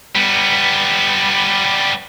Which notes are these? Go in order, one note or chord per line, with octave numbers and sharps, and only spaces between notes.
G3 B3